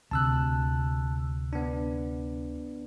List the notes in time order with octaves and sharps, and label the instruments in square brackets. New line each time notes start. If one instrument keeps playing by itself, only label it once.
[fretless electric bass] D2 C3 [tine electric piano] A5 E6 F#6
[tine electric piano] B3 D4